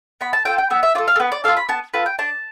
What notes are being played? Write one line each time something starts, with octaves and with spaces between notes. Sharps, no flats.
B3 B5
A5
F4 A4 G5
G5
B3 E5
E5
F4 A4 D5
F5
A4
B3 B4
D5
F4 A4 F5
B5
B3 A5
F4 A4 B4
G5
D4 A5